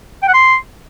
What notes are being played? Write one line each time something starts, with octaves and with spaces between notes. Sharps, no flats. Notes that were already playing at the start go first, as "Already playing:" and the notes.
G5
F#5
C6